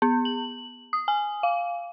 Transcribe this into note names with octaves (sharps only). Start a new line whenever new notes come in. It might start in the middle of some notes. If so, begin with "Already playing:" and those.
B3
F#7
D#6
G#5
F5